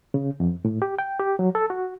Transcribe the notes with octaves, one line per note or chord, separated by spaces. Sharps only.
C#3
F2
A2
G4
G5
G4
F#3
A4
F#4